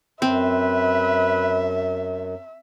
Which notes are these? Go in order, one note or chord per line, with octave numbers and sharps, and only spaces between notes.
F#2 C4 B4 E5